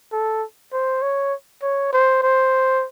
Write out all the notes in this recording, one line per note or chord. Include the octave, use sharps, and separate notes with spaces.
A4
C5
C#5
C#5
C5
C5